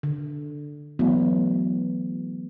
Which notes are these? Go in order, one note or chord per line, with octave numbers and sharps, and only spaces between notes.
D3
E3 F#3 A3 B3